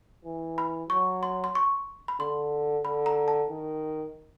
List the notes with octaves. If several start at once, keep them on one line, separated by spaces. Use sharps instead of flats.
E3
B5
F#3 C#6
C6
C6
C#6
B5
D3 C6
D3 B5
A#5
A5
D#3